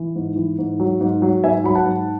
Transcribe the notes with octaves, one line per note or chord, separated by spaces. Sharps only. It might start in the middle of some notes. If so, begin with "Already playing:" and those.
Already playing: E3
G#2
E3
G#2
F#3
G#2
F#3
G#2 E5 G#5
F#3 B5
F#5 A5
G#2